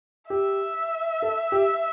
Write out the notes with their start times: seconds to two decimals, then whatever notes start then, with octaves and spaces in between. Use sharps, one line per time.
0.30 G4 E5
1.22 A4
1.52 G4